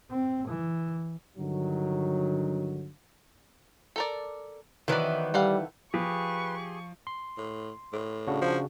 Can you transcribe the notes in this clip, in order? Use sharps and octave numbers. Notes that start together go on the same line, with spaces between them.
C4
E3
G2 D3 D#3 F#3
A4 A#4 D5
D#3 E3 F#3 B3 D5
G3 A4 F5 F#5
F3 G4 G#4 B4 C#6
C6
A2
A2
C#3 D4 F#4
F3